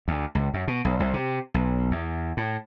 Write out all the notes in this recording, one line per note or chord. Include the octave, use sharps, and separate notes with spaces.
D2
C#2
F#2
B2
B1
C2
C3
B1
E2
A2